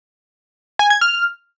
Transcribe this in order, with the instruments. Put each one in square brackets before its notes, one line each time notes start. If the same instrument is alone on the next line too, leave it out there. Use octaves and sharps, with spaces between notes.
[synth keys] G#5
G#6
F6